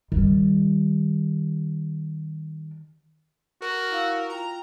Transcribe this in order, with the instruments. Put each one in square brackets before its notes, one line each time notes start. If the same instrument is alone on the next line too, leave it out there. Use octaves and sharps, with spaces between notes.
[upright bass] D#3 G3
[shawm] F#4 [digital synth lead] A#4
[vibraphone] E4 F5 E6
[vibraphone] F4 G5 [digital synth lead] A#5